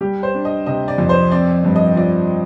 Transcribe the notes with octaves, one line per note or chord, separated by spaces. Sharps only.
G3 G4
C5
D4
D#5
C3 D#5
D5
F2
C5
C4 D5
G2
D#5
F3 D5